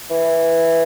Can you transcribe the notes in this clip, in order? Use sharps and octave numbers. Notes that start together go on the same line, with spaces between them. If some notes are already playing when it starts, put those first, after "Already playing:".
E3